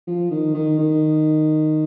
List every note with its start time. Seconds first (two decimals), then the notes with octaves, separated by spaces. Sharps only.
0.07 F3
0.31 D#3
0.54 D#3
0.78 D#3